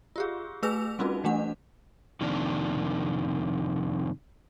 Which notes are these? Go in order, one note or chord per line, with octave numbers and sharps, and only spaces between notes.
F4 G4 G#4
A3 G#4 B4 E6 F7
G3 C4 C#4 D#4 F4 F#4
E3 A3 D4 F#5
F2 C3 D#3 A#3 D4